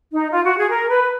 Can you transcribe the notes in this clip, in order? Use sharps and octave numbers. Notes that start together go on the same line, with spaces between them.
D#4
F4
F#4
G#4
A#4
B4